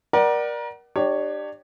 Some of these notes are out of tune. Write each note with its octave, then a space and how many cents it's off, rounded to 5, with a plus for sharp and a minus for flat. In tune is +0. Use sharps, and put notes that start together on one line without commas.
A#4 +30 D5 +15 F#5 +30
D4 +30 G4 +0 C#5 +0